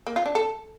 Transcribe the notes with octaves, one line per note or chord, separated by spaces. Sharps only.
A#3
F4
D4
A4